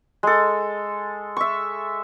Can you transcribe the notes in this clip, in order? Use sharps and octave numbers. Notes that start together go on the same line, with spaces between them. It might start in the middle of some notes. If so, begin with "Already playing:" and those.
G#3 A4
E5 C#6